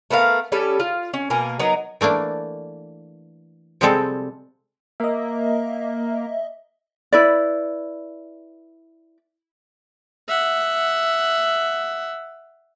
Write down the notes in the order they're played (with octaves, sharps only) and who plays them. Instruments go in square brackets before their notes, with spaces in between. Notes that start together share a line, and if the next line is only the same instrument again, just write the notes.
[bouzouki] A3 B3 A#4 F5
G3 C#4 G4 A4
F4
C#4
B2 A#3 G#5 A#5
F#3 B3 D#4 A#4
[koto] E3 A3 A#3 D4
C3 F3 G3 G#3 C4 A4
[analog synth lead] A#3 [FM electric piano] D#5 E5
[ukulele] E4 B4 D5
[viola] E5 F#5